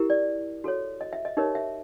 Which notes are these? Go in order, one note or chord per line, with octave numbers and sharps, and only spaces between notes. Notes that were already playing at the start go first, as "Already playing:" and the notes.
Already playing: E4 G4 A#4
D5
F#4 A4 C#5
D#5
E5
D#5
D#4 G4 A#4 C#5 D#5
E5